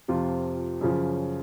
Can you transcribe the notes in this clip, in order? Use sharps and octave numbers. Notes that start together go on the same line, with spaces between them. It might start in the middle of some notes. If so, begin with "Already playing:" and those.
F2 C3 F3 F4
F#2 C#3 F3